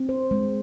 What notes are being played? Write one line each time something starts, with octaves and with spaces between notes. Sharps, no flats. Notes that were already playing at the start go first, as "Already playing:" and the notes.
Already playing: C4
C5
G#3